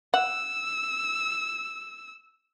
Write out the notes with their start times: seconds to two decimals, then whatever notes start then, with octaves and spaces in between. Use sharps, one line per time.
0.14 F#5 E6